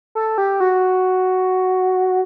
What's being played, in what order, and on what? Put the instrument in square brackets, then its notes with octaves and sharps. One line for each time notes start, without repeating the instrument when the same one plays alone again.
[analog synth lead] A4
G4
F#4